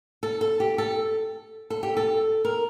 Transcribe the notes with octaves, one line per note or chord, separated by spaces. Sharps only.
A4
A4
G4
A4
A4
G4
A4
A#4